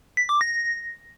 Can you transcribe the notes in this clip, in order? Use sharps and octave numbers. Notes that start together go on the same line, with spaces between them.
B6
D6
A#6